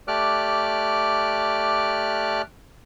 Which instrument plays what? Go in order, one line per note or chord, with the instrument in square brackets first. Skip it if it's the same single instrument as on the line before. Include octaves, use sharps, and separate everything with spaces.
[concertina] A3 G4 D5 D6 F6 F#6